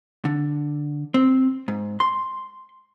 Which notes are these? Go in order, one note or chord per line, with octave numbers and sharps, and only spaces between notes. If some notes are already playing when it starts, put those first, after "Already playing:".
D3
C4
G#2
C6